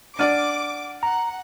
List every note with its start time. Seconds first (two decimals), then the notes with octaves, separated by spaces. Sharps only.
0.19 D4 D5 F#5 D6 F6 D#7
1.03 F#5 A#5